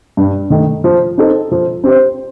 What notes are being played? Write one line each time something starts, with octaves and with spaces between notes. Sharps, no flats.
G2
D#3 A3
F3
C4 D#4 A4
F3
C4 G4 C5